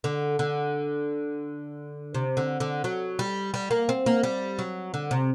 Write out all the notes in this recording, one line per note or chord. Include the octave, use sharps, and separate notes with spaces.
D3
D3
C3
D3
D3
F#3
G3
G3
A#3
C4
A#3
G3
F#3
D3
C3